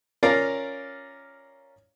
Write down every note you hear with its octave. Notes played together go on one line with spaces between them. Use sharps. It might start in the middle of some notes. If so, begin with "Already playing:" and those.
C#4 F4 A#4 D5 F5 A#5